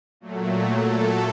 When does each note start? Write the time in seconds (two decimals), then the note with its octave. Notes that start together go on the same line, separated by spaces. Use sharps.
0.20 A#2 F#3 A3
0.78 A4